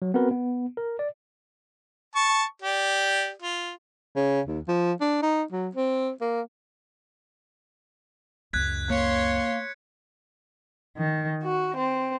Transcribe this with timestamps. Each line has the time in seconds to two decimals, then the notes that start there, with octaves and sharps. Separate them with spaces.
0.02 F#3
0.14 B3 C4 F#4 A#4 B4
0.31 B3
0.77 A#4
0.99 D5
2.15 A5 C#6
2.62 G4 D5
3.42 F4
4.16 C#3
4.47 D#2
4.68 F3
5.01 D4
5.23 D#4
5.52 F#3
5.75 C4
6.21 A#3
8.53 C#2 F#2 F#6 G#6 B6
8.90 A#3 C#5 C6 F#6 C#7
10.98 D#3
11.42 F#4
11.76 C4